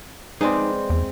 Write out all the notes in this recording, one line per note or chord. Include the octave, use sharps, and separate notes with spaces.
G#3 C4 D#4 G#4 B4 D5
E2